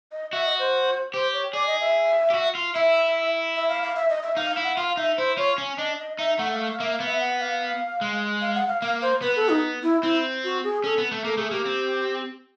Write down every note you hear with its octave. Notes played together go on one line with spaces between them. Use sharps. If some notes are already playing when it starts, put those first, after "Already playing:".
D#5
F#4 E5
D#5
C5
G4 C5
C#5
G#4 D5
D#5
E5
G4
F#4
F4
E4 E5
E5
F5
F5
E5
D#5
E5
D#4 F5
F5
E4
F#5
F4 F5
D#4 E5
E4 C5
F4 C#5
C#4
D4 D#5
D#5
D#4 E5
A3 F#5
F5
F5
A#3 E5
F5
B3
E5
F#5
F5
G#3
F5
F#5
F5
A#3 F5
C5
B3 B4
A4
D#4
E4
C4 E4
F#4
G#4
C#4 A4
B3
A3
A#3 A4
A3 G#4
A#3 G4
C4